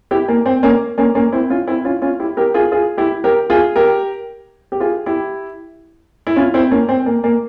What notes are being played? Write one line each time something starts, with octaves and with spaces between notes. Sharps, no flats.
E4 G4
A#3
C4
A#3 C#4
A#3 C#4
A#3 C#4
C4 E4
C#4 F4
C4 E4
C#4 F4
C#4 F4
E4 G4
G4 A#4
F4 G#4
F4 G#4
E4 G4
G4 A#4
F4 G#4
G4 A#4
G4
F4 G#4
E4 G4
E4
C#4 F4
C4 E4
A#3 C#4
C4
A#3
A#3